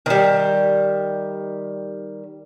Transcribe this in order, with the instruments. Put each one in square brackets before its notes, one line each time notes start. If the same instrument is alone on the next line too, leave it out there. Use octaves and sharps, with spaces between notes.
[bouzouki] D#3 G3